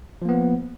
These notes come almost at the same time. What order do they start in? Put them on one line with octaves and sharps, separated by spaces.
F3 A#3 B3